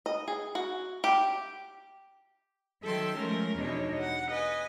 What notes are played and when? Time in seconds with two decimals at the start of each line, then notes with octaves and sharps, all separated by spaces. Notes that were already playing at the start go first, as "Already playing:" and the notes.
0.06 D#5
0.28 G#4
0.55 F#4
1.04 G4
2.82 D#3 F#3 A4 E5 G5 C6
3.16 F3 G#3 A3 C#4 A#4
3.57 E2 B2 D4 D#4 C#5
3.99 F#5
4.31 B4 D#5 G#5